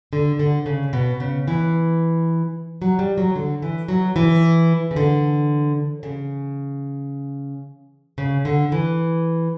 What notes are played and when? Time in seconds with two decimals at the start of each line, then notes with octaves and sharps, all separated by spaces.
0.13 D3
0.39 D3
0.66 C#3
0.93 B2
1.20 C#3
1.48 E3
2.82 F#3
2.99 G3
3.18 F#3
3.36 D3
3.62 E3
3.88 F#3
4.16 E3
4.91 C#3
4.96 D3
6.03 C#3
8.18 C#3
8.45 D3
8.72 E3